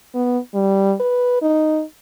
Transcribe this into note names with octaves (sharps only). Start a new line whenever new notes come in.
B3
G3
B4
D#4